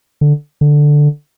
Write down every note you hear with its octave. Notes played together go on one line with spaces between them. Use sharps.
D3
D3